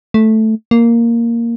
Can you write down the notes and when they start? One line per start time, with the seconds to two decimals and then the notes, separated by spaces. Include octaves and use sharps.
0.14 A3
0.71 A#3